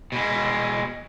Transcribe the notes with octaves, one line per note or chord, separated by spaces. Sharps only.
B2 G#3